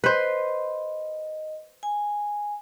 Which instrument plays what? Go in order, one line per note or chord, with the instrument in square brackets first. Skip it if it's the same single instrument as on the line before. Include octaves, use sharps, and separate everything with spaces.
[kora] B4 C5 [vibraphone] D#5
[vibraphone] G#5